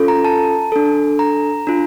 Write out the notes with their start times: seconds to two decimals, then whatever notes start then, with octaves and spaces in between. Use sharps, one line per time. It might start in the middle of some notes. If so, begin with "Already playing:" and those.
Already playing: C#4 F4 A4
0.08 A#5
0.25 A5
0.72 D4 A4
1.19 A#5
1.67 D4 F4